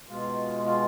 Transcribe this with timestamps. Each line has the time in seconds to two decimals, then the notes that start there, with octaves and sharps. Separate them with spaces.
0.09 B2 G#3 F4
0.65 F4